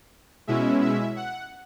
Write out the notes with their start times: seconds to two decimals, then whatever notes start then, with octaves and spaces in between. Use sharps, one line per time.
0.47 B2 G#3 C#4 E4 E5
0.81 E5
1.16 F#5